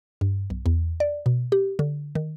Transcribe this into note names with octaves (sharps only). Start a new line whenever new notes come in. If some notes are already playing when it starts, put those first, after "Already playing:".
G2
B1
E2
D5
B2
G4
D3
D#3